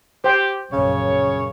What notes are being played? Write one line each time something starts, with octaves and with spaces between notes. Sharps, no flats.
G4 C5 G5
A#1 F#2 C#3 C#5